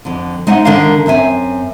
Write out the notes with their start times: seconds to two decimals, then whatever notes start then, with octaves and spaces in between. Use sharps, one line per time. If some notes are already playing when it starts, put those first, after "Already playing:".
0.05 F2 D3
0.47 G#3 D#4 D#5 E5 F#5
0.65 D3 D#3 D4 A#4 F5 A5
1.06 F#2 C4 E5 G#5